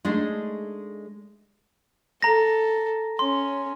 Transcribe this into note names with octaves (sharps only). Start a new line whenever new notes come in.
G#3 A3 D4 D#4 G#4
A4 A#5 A#6
C#4 C6